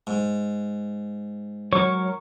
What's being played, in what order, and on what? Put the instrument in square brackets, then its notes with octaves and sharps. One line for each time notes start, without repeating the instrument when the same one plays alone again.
[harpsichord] G#2
[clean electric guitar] F#3 A#4 [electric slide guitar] C#5 [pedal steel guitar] C#6